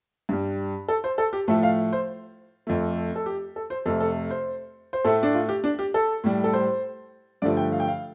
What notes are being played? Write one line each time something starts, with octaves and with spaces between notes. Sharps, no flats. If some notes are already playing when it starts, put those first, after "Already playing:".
G2 G3
A4
C5
A4
G4
A2 F3 A3 A4
F5
C5
F2 F3 A3
A4
G4
A4
C5
F2 C3 A3 A4
A4
C5
C5
A2 A3 A4
D4
F4
G4
D4
G4
A4
A2 G3
A4
C5
G2 D3 F3 A3 D5
G5
F5
G5
F5